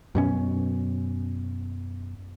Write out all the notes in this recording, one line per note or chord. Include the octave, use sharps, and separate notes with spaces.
F#2 B2 C#4